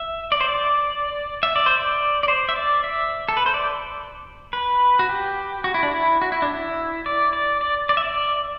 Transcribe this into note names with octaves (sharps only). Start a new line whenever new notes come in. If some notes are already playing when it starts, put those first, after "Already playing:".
Already playing: E5
D5
C5
D5
E5
D5
C5
D5
D5
C5
E5
D5
E5
A4
B4
C5
D5
B4
F#4
G4
F#4
E4
D4
E4
F#4
E4
D4
E4
D5
D5
D5
D5
E5
D5